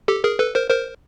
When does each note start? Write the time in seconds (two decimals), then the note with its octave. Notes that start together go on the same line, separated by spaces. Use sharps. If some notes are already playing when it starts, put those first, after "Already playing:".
0.08 G4 A4
0.24 G#4 A#4
0.39 A4 B4
0.55 A#4 C5
0.70 A#4 C5